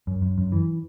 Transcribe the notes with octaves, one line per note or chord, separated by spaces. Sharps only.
F#2
F#2
F#2
E3